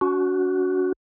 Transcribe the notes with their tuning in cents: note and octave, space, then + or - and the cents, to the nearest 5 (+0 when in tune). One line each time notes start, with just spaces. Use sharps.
C#4 +45 F#4 +0